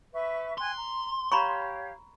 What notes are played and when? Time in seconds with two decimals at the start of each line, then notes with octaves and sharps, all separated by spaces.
0.13 B4 E5 C#6
0.58 G5 G#5 C6 F#6
0.76 A#5
1.32 G4 C#5 F5 A#5 B5 C#6